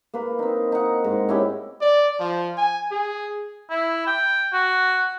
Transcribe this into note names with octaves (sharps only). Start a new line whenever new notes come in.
A#3 B4
C4 D#4
D#4 F#5
G#2
C#4 E4 G4
D5
F3
G#5
G#4
E4
G5
F#4